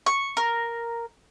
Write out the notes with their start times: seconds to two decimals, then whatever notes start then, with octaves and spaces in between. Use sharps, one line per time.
0.06 C#6
0.37 A#4